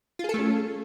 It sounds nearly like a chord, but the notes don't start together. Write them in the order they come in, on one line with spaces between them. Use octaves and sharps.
F4 G#4 A4 A3 C#4